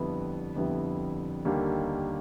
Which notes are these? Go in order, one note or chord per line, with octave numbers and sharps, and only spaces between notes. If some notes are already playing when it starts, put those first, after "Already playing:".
Already playing: F2 D3 G3 B3 E4
F2 D3 G3 B3 E4
D#2 D3 G3 A#3 D#4